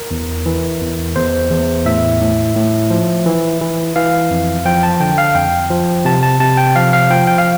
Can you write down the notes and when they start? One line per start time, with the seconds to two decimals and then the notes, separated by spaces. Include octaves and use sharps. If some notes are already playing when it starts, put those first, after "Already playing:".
Already playing: A#4
0.11 E2
0.46 E3
0.81 E2
1.16 E2 C5
1.51 E2
1.86 A2 E5
2.21 A2
2.55 A2
2.90 F3
3.26 E3
3.61 E3
3.96 E3 F5
4.31 F2
4.65 F3 G5
4.83 A5
5.00 D3 G5
5.18 F5
5.35 F2 G5
5.70 F3
6.05 C3 A5
6.23 A5
6.40 C3 A5
6.57 G5
6.75 F3 F5
6.93 F5
7.10 F3 G5
7.27 G5
7.38 F5